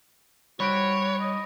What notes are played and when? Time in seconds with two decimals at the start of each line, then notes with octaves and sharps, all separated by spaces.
0.60 G3 D#4 F#4 C5 C#5 B5 D7
1.20 D#5